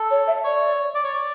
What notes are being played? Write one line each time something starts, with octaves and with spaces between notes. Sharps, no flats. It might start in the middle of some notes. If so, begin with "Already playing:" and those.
Already playing: A4
C#5
E5
C#5 D5
D5
C#5
D5